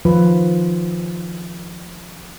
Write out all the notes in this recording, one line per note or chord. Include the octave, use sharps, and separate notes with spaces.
D#3 F3 F4 B4